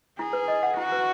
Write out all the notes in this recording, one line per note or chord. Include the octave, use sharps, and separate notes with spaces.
E4 G#4
B4
D#5
F#5
E4 F#4
B4